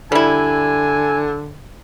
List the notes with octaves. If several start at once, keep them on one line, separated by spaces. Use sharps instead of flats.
D3 G3 E4 G#5